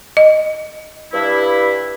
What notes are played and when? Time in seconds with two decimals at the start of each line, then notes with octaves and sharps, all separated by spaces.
0.17 D#5
1.13 G2 E4